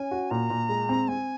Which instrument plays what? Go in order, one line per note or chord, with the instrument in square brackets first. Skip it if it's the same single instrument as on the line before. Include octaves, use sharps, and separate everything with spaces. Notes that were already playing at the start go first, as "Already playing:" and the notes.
Already playing: [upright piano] C#4 [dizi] G#5
[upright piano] F#4
[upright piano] A#2 [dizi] A#5
[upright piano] A#2
G#3
C4
[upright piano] C4 [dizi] G#5